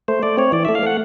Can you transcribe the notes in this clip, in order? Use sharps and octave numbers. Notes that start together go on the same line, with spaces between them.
A3 C5
A3 D5
C4 C#5
E3 D5
A3 E5
F5
A3 F#5